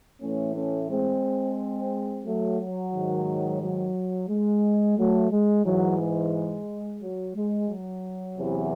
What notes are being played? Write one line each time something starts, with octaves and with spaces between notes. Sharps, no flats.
A2 E3 A3 C#4
A3 C#4
G#3 C4
F#3 A3
F#3
G#2 D#3
F#3
G#3
F#3 A3
G#3
G#2 E3 F#3
G#3
F#3
G#3
F#3
E2 C3 E3